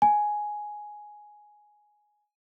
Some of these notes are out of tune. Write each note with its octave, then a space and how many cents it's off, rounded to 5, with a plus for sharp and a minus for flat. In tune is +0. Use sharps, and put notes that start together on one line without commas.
G#5 +5